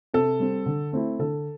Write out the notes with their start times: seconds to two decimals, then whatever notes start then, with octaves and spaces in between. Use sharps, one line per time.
0.14 C3 A4
0.40 G3 C4
0.66 D3
0.93 A3 C4 E4
1.19 D3 A4